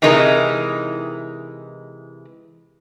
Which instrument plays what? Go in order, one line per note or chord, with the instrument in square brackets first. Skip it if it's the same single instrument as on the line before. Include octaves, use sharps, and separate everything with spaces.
[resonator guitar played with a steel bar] C3 E3 G#3 D#4 E4 A#4